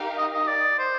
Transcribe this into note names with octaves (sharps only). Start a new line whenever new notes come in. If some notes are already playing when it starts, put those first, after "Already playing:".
Already playing: D#4 G4 A#4 F5
D#5
D#5
D5
C5